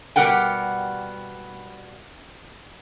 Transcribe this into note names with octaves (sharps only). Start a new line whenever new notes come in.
B2 G3 G4 A#4 F#5 G5